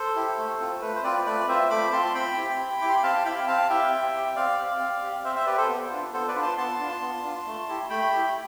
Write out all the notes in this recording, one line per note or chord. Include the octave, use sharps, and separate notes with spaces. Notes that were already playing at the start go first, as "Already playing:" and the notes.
Already playing: A4 C5
E4 G4
A3
C4 F4
A3 B4
C5
C4 F4 B4 D5
A3 B4 D5
C4 F4 C5 E5
A3 B5 D6
C4 F4 A5 C6
C4 G5 B5
E4 G4
C4
E4 G4 C6 D6
B5
C4 F5 A5
E4 G4 G5 B5
C4 F5 A5
E4 G4 E5 G5
C4
G4
C4 D5 F5
G4
C4
G4
C4 C5 E5
C5 E5
G4 B4 D5
A4 C5
B3
D4 F4
B3 A4 C5
B4 D5
D4 F4
A5 C6
B3 A5 C6
D4 F4
B3
D4 F4
A3
E4 G4
A3 G5 B5
E4 G4